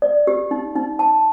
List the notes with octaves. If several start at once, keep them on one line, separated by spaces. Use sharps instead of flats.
D5
G4
D#4
D#4
A5